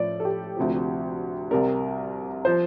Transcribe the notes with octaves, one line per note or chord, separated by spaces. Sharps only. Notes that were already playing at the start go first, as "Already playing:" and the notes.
Already playing: A2 F3 D5
A4
G4
D2 C3 F3
C2 C3 G3 A#4
F3 C5